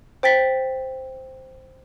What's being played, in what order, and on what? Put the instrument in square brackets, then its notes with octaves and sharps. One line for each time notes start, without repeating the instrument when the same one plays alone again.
[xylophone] C5 G5 A6 B6